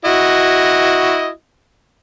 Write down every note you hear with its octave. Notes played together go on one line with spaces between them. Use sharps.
E4 F#4 D#5